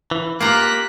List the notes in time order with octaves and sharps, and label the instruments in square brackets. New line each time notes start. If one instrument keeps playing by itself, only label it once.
[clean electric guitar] E3
[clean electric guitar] A#3 [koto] F4 G4 A#5 [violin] F#6 B6